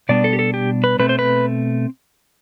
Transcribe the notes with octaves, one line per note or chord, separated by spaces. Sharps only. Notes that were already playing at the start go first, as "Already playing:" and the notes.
B2 G3 B3 D4 D5
A4
G4
A4
G4
B4
B2 A3 C4 B4
C5
B4